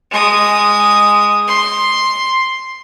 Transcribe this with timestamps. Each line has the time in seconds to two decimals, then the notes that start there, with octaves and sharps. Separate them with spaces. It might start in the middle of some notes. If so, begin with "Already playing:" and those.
0.11 G#3 D#6
1.47 C6